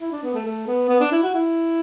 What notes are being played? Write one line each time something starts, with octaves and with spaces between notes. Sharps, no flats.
E4
D4
B3
A3
A3
B3
B3
D4
E4
F#4
E4